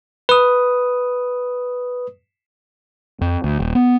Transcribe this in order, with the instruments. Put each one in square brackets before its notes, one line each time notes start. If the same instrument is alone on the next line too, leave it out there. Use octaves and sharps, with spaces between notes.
[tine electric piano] B4 D#6
[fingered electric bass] F2
D2
D#1
B3